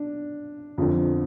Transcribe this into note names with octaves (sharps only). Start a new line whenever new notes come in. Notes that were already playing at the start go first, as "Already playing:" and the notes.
Already playing: D4
F2 D3 F3